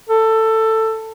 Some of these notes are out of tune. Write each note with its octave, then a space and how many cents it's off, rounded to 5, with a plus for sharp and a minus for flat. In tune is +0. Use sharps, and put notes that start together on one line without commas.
A4 +15